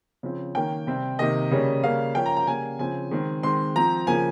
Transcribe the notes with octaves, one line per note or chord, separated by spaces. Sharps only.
C#3 F3 C4
D#3 A#3 C#4 G5
C3 G3 C4
C3 D#3 A#3 D#5
C#3 G3 A#3 C#4
C#3 G3 A#3 C#4 F5
F3 A#3 C#4 G5
A#5
A#5
C#3 G3 A#3 G#5
C#3 F3 C4 G#5
D#3 G#3 C4
D#3 G#3 C4 C6
F3 C4 A#5
C#3 F3 A#3 G#5